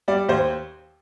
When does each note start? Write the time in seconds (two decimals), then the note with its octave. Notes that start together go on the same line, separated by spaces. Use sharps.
0.08 G3 D5
0.29 D#2 C5